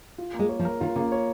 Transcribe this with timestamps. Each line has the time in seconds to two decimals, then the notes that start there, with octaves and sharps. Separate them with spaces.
0.18 F4
0.34 A#3
0.39 G#3
0.49 C#5
0.59 F3
0.65 A#4
0.81 D#3 F4
0.95 C#3 A#3
1.12 C#5